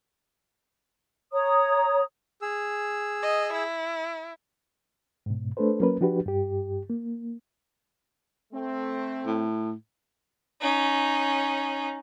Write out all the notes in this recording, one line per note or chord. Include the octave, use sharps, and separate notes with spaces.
C#5 A#5 D#6
G#4 E6
D#5
E4
G#2 B2
A3 D4 A4 B4 C5
F#3 A#3 C#4 A#4 B4
F3 D4 F#4 G4 B4
G2 G4
A#3
A3 C4
A2
C#4 D#4